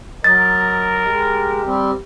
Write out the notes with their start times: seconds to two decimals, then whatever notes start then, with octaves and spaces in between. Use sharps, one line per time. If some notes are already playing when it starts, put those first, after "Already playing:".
0.24 F#3 A#4 D#5 A6
1.08 G#3 G4
1.65 G3 C4